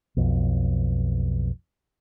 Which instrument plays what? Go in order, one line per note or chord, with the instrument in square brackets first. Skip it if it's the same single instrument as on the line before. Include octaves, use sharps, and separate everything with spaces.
[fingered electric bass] B1 F2